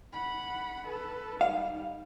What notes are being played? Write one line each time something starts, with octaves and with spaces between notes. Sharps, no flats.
F#5 B5
A4 B4
G3 D#4 F5